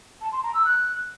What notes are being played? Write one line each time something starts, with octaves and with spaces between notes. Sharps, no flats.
A5
C6
A#5
E6
F#6